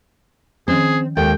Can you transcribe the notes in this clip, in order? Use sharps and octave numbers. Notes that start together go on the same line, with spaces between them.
D#3 F3 C4 C#4 G#4
D#2 G#3 A4 G5